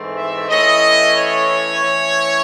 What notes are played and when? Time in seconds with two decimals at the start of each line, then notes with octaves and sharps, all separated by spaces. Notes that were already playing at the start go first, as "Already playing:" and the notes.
Already playing: G#2 E3 A3 C4
0.15 E5
0.48 A2 E3 A3 C#4 E4 D#5
1.15 C#5
1.81 E3 A3 C#4 E4